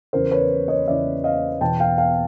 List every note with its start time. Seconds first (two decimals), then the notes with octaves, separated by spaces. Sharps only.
0.13 E2 C#3 E3 A#4 C5
0.31 B4 C#5
0.68 C#5 D#5
0.87 E2 C#3 E3 D5 E5
1.24 D#5 F5
1.61 E2 B2 G5 A5
1.80 F5 G5
1.98 F5 G5